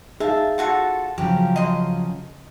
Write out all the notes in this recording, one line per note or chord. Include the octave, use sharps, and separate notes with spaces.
D#4 G#4 E5 F5 A5
F4 F#4 A4
C#3 F3 F#3 G4
D#5 C6